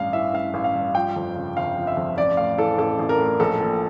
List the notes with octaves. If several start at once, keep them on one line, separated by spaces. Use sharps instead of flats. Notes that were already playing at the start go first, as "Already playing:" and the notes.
Already playing: A1 G2 F5
E3 E5
A1 F5
A1
F5
G2
F3 G5
F2
C#3
G1 F5
F3
E5
F2
A1 D5
A2 F5
E3 A4
A1 A4
A1
A#4
A2
A#1 A4
A#2